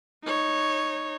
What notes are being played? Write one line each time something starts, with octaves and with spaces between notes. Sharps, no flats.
D#4 C#5